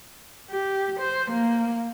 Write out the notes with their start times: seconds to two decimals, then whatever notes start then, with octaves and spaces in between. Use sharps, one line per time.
0.51 G4
1.00 C5
1.31 A#3